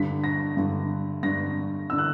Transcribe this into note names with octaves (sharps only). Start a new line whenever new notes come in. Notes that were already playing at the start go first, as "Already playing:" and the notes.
Already playing: G2 D3 B6
A#6
G2 D3
G2 D3 A#6
D3 E6
F#6